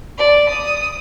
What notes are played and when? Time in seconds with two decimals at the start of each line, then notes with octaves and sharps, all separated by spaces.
0.18 D5
0.49 D#6